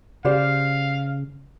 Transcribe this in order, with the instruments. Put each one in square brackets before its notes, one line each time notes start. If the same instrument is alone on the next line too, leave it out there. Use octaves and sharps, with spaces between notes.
[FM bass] C#3 [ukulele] G4 C5 D5 [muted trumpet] F5